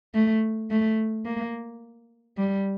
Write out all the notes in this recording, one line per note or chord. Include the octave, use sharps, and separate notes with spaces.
A3
A3
A#3
G3